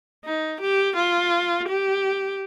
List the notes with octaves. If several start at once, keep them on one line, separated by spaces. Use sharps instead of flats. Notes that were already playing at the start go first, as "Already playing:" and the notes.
D#4
G4
F4
G4